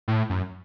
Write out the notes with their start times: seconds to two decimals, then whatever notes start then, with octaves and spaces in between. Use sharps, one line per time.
0.08 A2
0.30 F#2